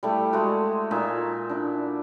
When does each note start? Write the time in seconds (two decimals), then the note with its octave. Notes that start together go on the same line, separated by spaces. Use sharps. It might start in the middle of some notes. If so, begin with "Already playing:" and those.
0.03 G3 A3 E4
0.33 G#3 A3 F#4
0.91 A#2 D#4 E5 G#5
1.49 D4 E4